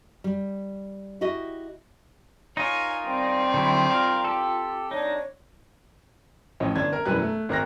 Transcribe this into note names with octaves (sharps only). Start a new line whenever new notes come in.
G3
E4 F#4 G4 D#5
D#4 F4 A#4 C#5 G#5
D#3 G3 C4
D3 F#3 E4 C6
F4 A#4 F5
G4 A4
G2 D4 D#4 C#5
A1 F3 C#5 D#5
G1 D4 G#6
A#4
E1 F#2 E3 G3 B4 F#6
A3
G#1 A#4 F#6 A#6